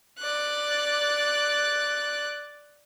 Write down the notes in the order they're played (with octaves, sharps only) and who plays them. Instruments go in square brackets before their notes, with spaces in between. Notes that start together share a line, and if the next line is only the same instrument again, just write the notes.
[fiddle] D5 F#6